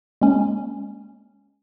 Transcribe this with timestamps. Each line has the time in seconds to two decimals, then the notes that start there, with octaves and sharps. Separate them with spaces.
0.21 G#3 A#3 C#4